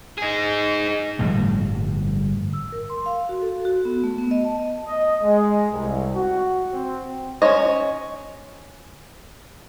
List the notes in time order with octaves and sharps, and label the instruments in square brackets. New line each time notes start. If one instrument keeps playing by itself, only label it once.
[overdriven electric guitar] D#4 G#4
[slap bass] G1 A2 F3 G3
[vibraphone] E6
A#4
C6
F5
F#4
A4
F#4
B3
A3
B3
D#5
A5
[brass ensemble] D#5
G#3
C2
F#4
C4
[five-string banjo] C#4 F#4 C5 C#5 D#5